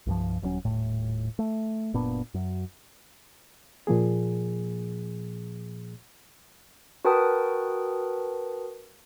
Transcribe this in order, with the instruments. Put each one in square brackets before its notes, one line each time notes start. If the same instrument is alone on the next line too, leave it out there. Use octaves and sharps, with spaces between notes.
[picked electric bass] C2 G2 F3
D#1 G2 F#3 C#4
D#1 B1 A2
A3
F#1 A#2 B3 D4
F#2 F#3
[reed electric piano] A#2 F3 A#3 G#4
[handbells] F#4 A#4 B4 G5 A5 D#6